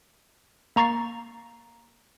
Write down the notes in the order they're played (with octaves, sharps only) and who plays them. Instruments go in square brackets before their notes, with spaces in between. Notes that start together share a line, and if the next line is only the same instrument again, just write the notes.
[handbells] A#3 A#5 C#6 A6 C7